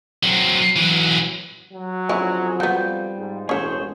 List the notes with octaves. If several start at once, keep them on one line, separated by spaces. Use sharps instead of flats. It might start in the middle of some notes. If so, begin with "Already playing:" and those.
F#3 C4
E3 F#3
F#3
F2 D3 C#4 E4 G#4
G3 B3 F4 F#4 G6
G#2
E1 A1 C#4 G#4 C5 C#5